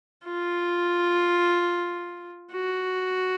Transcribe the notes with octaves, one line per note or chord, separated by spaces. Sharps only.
F4
F#4